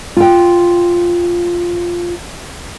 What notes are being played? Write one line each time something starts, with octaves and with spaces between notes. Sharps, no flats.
F4 G5